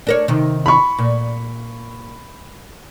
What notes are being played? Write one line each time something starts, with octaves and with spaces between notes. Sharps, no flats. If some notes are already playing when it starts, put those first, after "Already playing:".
D4 A#4 C#5
C3 D#3
B5 C#6
A#2